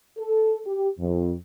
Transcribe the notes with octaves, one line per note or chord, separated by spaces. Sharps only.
A4
G4
F2